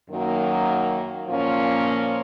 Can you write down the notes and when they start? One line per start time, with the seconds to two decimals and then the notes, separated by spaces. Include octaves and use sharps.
0.11 F#2 D#3 F#3 A#3
1.28 A#2 F3 A#3 C#4